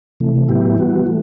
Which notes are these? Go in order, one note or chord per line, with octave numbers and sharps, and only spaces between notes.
C3 E3 A3
A2 F#3 B3 E4 G4
E3 G3 B3 F#4
E3 A3